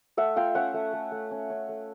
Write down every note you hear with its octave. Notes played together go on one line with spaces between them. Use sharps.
A3 E5 F#5
F4 F5 G5
C#4 E5 F#5
A3
A3
A3
C#4
C#4
A3